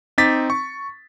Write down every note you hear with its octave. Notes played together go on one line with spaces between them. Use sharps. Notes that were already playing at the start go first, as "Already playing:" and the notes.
C4 D#4 D6 A6 B6
C#6